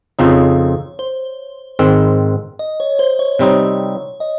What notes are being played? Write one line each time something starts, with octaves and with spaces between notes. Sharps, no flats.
F2 C#3 F3 C4 D#4 C#5
C5
G#2 D#3 G#3 C4
D#5
C#5
C5
C#5
C3 G3 C4 D#4 C#5
D#5